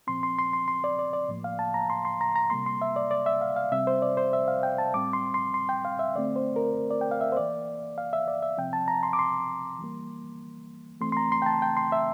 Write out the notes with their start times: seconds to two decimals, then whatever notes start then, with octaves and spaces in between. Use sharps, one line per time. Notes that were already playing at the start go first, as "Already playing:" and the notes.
0.07 A#2 F3 C4 C6
0.23 C6
0.39 C6
0.53 C6
0.68 C6
0.84 D5
0.99 D5
1.13 D5
1.29 A2 F3 A#3
1.44 F5
1.59 A5
1.74 A#5
1.90 C6
2.05 C6
2.21 A#5
2.36 A#5
2.50 C3 G3 A#3 C6
2.66 C6
2.82 E5
2.96 D5
3.11 D5
3.26 E5
3.41 F5
3.56 F5
3.72 C3 G3 C4 E5
3.87 C5
4.02 D5
4.17 C5
4.33 E5
4.48 F5
4.63 G5
4.78 A5
4.93 A2 G3 C4 D6
5.13 C6
5.34 C6
5.54 C6
5.69 G5
5.85 F5
5.99 E5
6.16 D3 A3 C4 D5
6.36 C5
6.56 A#4
6.91 D5
7.01 G5
7.11 F5
7.21 E5
7.32 C5
7.36 E3 A#3 D5
7.98 F5
8.13 E5
8.28 D5
8.43 E5
8.57 C3 F3 C4 G5
8.73 A5
8.88 A#5
9.03 C6
9.13 D6
9.19 C6
9.79 E3 G3 A#3
11.01 E3 A3 C4 C6
11.12 C6
11.17 A#5
11.32 C6
11.42 G5
11.46 A5
11.62 G5
11.77 C6
11.92 E5